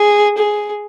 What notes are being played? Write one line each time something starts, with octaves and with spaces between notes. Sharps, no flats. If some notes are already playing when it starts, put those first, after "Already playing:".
Already playing: G#4
G#4